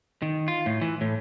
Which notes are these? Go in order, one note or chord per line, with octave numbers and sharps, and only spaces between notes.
D#3
F4
A2
E3
A2